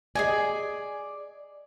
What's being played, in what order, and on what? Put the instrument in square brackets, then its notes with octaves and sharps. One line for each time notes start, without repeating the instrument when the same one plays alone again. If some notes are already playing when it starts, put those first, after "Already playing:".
[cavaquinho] G#4 D#5 G#5 [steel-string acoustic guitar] D5